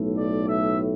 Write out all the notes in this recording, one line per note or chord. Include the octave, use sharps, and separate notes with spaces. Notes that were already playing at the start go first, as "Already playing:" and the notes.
Already playing: B1 A2 A3
D5
E5